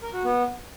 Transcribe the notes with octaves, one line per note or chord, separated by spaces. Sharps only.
A#4
F#4
B3